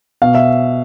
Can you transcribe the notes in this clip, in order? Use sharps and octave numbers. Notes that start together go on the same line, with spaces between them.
B2 F5
E5